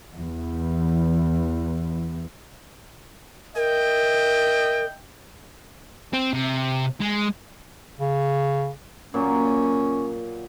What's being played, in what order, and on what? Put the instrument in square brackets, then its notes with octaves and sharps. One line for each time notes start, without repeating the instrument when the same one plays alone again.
[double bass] E2 E3
[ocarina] A#4 [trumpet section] D#5 E5 G5
[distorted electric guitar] C4
C3
G#3
[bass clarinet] C#3
[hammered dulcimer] A#2 F#3 [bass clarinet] C#4